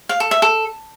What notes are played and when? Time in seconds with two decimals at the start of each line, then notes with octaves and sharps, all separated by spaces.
0.09 F5
0.20 A4
0.31 E5
0.42 A4